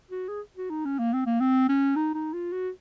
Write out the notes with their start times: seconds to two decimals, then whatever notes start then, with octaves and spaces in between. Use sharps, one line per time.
0.11 F#4
0.28 G#4
0.57 F#4
0.70 D#4
0.85 C#4
0.99 A#3
1.13 C4
1.26 A#3
1.40 C4
1.69 C#4
1.96 D#4
2.14 D#4
2.33 F4
2.52 F#4